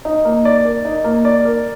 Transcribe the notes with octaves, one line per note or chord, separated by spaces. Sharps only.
D#4
A#3
D5
A#4
D#4
A#3
D5
A#4